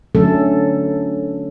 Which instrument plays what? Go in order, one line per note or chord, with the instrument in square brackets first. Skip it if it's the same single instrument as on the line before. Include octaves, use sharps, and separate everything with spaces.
[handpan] D3 F#3 A3 C#4 A4